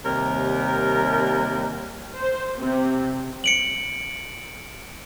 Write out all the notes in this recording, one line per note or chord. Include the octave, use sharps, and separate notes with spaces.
D#2 C3 G3 A#4
C5
C3
C#7 D7 F#7